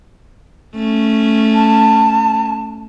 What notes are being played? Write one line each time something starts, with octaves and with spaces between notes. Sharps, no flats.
A3 C#4
A5